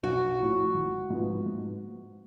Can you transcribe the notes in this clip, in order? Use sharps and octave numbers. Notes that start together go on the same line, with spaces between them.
B1 F#4
A2 F3
G#1
G#2 F3 B3
G#2